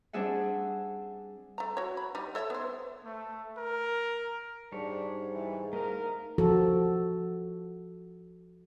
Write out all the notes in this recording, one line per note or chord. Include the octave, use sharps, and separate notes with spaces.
G3 C4 D4 G#4 E5 F#5
A3 A#5
F#4 C#5
B5
G3 D#4
A4 C#5 E5
B3 C5
A3
A#4
G#2 G3 D4 C#5
E3
A3 D#4 A#4 F5
F3 F#4 A4